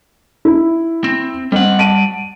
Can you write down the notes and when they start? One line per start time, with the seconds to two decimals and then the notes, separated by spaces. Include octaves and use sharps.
0.45 E4
1.04 C4
1.52 G3 C4 D#5 F#5
1.79 A5 D7 D#7